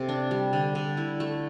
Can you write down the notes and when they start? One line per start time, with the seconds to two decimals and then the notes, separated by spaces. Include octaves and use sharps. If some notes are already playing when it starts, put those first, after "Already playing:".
Already playing: C3 A4
0.09 D4
0.31 G3
0.53 D3
0.75 D3
0.97 E4
1.20 A3